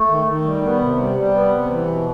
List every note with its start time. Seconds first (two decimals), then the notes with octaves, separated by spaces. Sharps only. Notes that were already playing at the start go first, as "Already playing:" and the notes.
Already playing: A3
0.09 D#3
0.27 D#3
0.44 G3
0.63 B3
0.80 C3
0.98 G3
1.16 G3
1.34 B3
1.51 C3
1.70 E3
1.87 B2